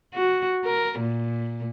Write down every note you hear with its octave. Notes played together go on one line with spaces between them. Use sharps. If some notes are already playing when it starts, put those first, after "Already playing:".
F#4
A#4
A#2